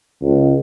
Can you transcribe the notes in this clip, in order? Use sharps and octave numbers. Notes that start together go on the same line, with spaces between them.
C#2